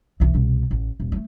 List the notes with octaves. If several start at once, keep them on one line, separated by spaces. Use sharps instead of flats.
B1 E3
C2 B2
A1
D#1
G3 A3